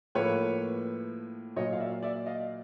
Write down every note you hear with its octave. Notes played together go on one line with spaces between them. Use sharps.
A2 F3 A#3 B4 C#5
A#2 F#3 A#3 C#5 D#5
F5
D5 E5
D5 E5
D#5 F5